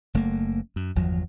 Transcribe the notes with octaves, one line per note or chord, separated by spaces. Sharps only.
F#1 A3 A#3
F#2
G1 E2 F3 F#3